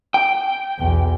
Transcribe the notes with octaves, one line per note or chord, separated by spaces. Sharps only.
G5
B1 E2